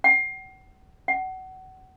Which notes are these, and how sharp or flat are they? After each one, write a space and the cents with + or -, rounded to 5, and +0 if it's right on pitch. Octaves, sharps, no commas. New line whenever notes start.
F#5 +40
F#5 +25